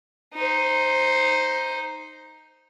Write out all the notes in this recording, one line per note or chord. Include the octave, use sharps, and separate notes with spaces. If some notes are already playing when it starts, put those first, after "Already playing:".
D#4 C5